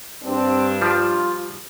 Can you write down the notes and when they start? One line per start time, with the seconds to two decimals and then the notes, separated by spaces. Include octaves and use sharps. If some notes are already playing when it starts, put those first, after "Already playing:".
0.24 G2 C4 D4
0.82 F3 G3 F4